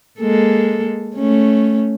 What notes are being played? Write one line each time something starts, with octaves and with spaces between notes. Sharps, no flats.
G#3 A#3 A4
A3 C#4